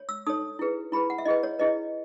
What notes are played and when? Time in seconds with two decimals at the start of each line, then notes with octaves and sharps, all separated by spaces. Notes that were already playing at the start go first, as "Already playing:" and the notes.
Already playing: C#5
0.09 E6
0.27 D#4 A4 C#5 D#6
0.59 E4 G#4 B4
0.92 E4 G#4 B4 B5
1.10 F#5
1.18 E5
1.25 E4 G#4 B4 D#5
1.43 C#5
1.59 E4 G#4 B4 D#5